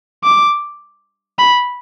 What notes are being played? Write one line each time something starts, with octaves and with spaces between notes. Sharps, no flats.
D6
B5